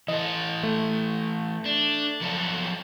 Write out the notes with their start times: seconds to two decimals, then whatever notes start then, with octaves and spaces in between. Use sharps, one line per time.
0.08 E3 A4 D#5
0.63 A3
1.65 D4
2.21 F3 F#3 A4